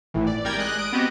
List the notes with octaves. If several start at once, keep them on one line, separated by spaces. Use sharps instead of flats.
G#1 A2 E3
D5
G#1 G3 A#4 D5 G5 G#6
G#3 D#5 F#6
D#6 D7
B3 C4 F#4 G4 D#5